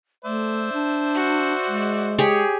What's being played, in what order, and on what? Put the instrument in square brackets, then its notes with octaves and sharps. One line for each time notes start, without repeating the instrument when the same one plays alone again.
[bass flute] A3 [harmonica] C5 D5 E5
[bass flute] D4
[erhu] F#4
[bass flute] G#3
[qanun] G4 G#4 C#5